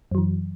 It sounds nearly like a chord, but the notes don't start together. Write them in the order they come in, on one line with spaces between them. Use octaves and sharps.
F#2 F#3 E3